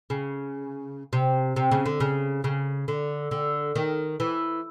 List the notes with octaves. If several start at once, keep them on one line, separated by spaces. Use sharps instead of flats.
C#3
C3
C3
C#3
D3
C#3
C#3
D3
D3
D#3
E3